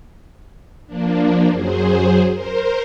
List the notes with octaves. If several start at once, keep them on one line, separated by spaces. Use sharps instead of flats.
F3 A#3 D4
F#2 F#3 G#4 C5
A#4 C5